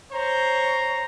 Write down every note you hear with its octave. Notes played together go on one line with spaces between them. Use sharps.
C5 C#5 A#5